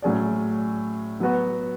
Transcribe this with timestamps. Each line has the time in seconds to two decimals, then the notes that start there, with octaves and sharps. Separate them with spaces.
0.02 A2 F#3 C#4 G#4 D5
1.20 F#3 B3 F#4